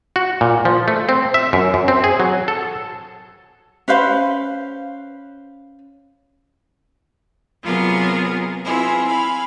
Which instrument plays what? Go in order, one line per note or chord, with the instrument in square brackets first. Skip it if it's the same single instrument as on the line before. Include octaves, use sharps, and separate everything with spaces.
[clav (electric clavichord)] F#4
A#2
F3
A3
C4
E5
F#2
F#2
C4
G#4
F#3
A4
[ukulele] C#4 B4 C5 F5
[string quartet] C3 F#3 B3 F4 G#4 A#4
C4 E4 F4 G#4 B4
F5 G#5 B5